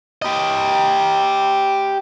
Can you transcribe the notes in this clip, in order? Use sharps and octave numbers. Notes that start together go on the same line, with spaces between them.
G4 D#5